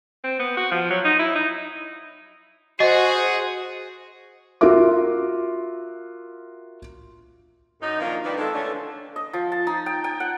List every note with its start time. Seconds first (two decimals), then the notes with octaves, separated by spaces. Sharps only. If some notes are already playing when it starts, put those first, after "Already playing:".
0.24 C4
0.40 B3
0.57 F#4
0.72 F3
0.90 F#3
1.05 D#4
1.19 E4
1.35 D#4
2.80 F#4 G#4 C5 D#5
4.61 F4 F#4 A#4 E5 D6
7.81 F#2 D#4
8.00 A#2 D#3 F3 A#3 D4 F4
8.23 D#3 G3 A#3 B3 D4
8.37 D#3 G#3 C4 F4 A4
8.53 D3 E3 A3 C#4 D4
9.16 D#5
9.33 F3
9.52 A5
9.67 D#4
9.86 G5
10.04 G5
10.20 F#5